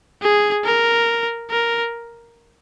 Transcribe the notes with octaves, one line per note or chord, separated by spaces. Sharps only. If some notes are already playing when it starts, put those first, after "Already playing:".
G#4
A#4
A#4